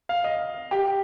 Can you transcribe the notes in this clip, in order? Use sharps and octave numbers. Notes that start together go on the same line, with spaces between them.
F5
D#5
G4